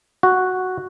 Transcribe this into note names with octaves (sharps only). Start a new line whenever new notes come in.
F#4